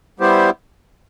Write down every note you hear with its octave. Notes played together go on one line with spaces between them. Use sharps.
G3 B3 E4 G4 C5